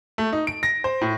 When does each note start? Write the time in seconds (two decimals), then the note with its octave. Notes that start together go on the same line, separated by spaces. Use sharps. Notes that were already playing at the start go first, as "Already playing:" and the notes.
0.18 A3
0.33 D#4
0.47 D7
0.63 A#6
0.84 C5
1.01 A2